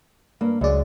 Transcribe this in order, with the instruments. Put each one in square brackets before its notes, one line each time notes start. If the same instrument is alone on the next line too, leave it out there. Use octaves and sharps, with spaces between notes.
[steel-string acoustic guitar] G2 A#3
[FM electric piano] C#2 D5 [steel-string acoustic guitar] F#2 G#3